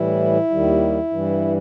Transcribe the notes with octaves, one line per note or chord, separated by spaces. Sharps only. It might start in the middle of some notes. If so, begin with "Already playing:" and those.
Already playing: A2 E3 G3 E4
D#2 D#3 G3
G2 E3 G3